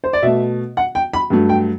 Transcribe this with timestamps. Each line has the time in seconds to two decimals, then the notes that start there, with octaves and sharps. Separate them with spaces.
0.04 C5
0.13 D5
0.22 B2 A3 E5
0.77 F#5
0.95 G5
1.13 B5
1.30 G2 F#3 A3
1.49 G5